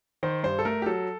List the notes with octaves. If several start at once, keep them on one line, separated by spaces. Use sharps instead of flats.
D#3 C5
G2 C5
A4
A3 A#4
G4
F#3 A4